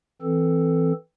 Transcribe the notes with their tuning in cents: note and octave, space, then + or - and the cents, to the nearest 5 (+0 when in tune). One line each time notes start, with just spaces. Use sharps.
E3 +0 C4 +0 A4 +0